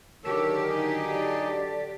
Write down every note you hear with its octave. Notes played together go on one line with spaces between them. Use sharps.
D3 D#3 F#3 G4 A4 A#4 C#5 E6
D#4 G#4 D#5
A4 D5